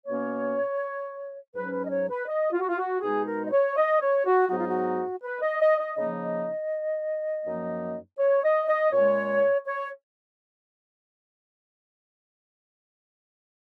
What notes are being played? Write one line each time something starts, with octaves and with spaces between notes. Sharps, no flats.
B2 A#3 C#4 C#5
G#2 F#3 C#4 B4
B4
D#5
C#5
B4
D#5
F4
F#4
F4
F#4
B2 G#3 D#4 G#4
A#4
D#5
C#5
D#5
C#5
F#4
G#2 F#3 B3 D#4 F#4
F4
F#4
B4
D#5
D#5
D#5
C#3 F3 A#3 D#4 D#5
D#5
F#2 F3 A#3 D#4
C#5
D#5
D#5
A#2 G#3 C#4 C#5
C#5